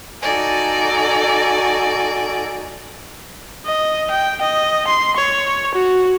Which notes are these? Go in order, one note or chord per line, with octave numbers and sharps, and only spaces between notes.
D#4 F#4 A4 D5 G#5
D#5
G5
D#5
C6
C#5
F#4